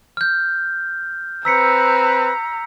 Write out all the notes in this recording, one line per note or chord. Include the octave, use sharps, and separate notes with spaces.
F6 G6
C4 B4 A#5 E6 B6 C#7